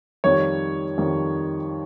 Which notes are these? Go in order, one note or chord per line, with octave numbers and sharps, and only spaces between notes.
F2 D#3 G3 C#5
F2 D#3 G3